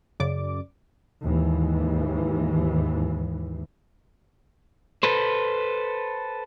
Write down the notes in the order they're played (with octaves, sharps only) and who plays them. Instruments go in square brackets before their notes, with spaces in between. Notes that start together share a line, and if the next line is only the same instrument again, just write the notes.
[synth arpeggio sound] F#2 C#3 D5 D6
[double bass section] D#2 G#2 E3
[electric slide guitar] A4 B4 C5